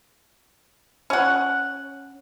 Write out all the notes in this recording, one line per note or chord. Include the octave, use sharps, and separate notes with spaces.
C#4 F#5